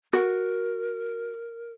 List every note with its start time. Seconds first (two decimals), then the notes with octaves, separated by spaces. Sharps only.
0.13 F#4 A#4